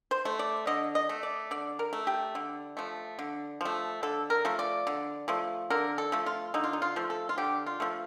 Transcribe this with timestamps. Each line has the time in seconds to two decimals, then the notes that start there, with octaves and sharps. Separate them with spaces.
0.11 C5
0.25 A3
0.39 D5
0.67 D3 D#5
0.95 D#5
1.09 A3
1.23 D5
1.51 D3 D5
1.79 A#4
1.93 A3
2.07 G4
2.35 D3
2.77 F3 A3
3.19 D3
3.61 F3 A3
4.03 D3 A4
4.30 A#4
4.45 F3 A3
4.59 D5
4.87 D3
5.28 F3 A3
5.70 D3 A#4
5.98 A4
6.12 F3 A3
6.26 F4
6.54 D3 D#4
6.64 F4
6.73 D#4
6.82 F4
6.96 F3 A3
7.10 A4
7.29 F4
7.38 D3 G4
7.66 F4
7.80 F3 A3